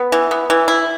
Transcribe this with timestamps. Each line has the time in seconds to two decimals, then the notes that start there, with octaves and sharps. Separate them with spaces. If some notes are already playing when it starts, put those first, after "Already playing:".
Already playing: B3
0.12 E3
0.31 B3
0.50 E3
0.68 E4